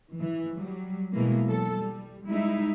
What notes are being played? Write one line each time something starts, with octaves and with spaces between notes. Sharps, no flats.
E3
F#3 G3
B2 E3 G#3 A#3
F#3 A4
G3
G3 G#3 D#4 E4 E5